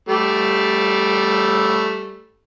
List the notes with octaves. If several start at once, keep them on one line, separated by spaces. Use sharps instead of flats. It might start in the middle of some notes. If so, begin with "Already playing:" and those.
G3 A3